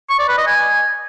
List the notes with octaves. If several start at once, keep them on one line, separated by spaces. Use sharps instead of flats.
C#6
D5
B4
D#5
G#5